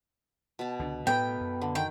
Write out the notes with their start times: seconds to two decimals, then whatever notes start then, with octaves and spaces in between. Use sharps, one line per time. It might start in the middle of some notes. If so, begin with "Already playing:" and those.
0.59 B2 A5
0.79 C#2 D3 D4
1.07 A2 B3 A4 B4 G5
1.40 F#2
1.62 D3
1.75 D#3 G5